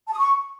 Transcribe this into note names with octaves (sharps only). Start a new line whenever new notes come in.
A5
D#6
C#6